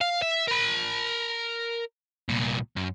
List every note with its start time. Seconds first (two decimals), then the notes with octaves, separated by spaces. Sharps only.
0.01 F5
0.22 E5
0.47 A#4 B5
2.29 C2 A#2
2.76 F#2